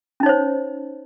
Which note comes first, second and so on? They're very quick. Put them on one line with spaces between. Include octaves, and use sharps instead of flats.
C#4 D#4 C#5 C5